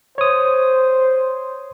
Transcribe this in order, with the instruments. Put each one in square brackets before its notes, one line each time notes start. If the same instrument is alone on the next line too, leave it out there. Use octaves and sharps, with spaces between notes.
[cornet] C5 [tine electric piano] C#5 D#6